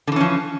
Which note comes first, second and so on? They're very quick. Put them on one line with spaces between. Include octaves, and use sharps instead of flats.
D3 E3 C#4 F3